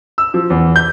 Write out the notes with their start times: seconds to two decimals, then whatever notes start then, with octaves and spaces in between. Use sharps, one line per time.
0.18 E6
0.34 F3
0.50 E2
0.76 G6